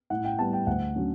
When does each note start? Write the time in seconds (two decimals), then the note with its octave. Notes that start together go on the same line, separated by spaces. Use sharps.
0.10 A2 F#5
0.25 G5
0.38 G3 B3 A5
0.53 G5
0.67 D2 F#5
0.95 D3 F#3 C#4